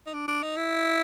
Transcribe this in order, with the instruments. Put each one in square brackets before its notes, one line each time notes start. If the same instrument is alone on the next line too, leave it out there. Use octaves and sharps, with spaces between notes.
[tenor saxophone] D#4
D4
D4
D#4
E4